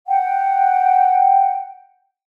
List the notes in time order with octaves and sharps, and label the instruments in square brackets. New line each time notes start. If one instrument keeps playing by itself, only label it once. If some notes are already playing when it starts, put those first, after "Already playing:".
[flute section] F#5 G5